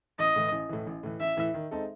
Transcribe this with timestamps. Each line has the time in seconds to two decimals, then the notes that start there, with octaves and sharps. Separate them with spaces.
0.19 A1 D#5
0.36 A2 E3
0.52 A1
0.69 A2 E3
0.87 A1
1.03 A2 E3
1.20 A1 E5
1.37 A2 E3
1.54 D#3
1.71 G#3 C4 D#4 A4